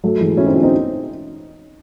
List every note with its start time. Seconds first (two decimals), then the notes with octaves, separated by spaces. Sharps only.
0.04 F#3 A3
0.21 E3 G#3
0.37 C#4 E4
0.46 C4 D#4
0.54 C#4 E4
0.63 C4 D#4